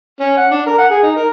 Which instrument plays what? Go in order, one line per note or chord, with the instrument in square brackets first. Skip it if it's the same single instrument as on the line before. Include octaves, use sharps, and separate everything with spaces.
[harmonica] C#4
F#5
D4
A#4
F#5
G#4
D#4
A#4